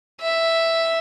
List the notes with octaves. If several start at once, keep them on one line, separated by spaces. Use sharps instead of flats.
E5